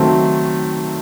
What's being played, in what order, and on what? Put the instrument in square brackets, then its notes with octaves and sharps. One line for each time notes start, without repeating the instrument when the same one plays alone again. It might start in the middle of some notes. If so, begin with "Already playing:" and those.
Already playing: [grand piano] D#3 F#3 A3 C4